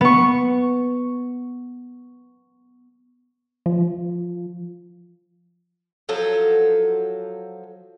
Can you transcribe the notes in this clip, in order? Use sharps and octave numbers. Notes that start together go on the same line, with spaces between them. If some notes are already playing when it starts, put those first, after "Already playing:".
B3 C#6
F3
F3 F#3 A4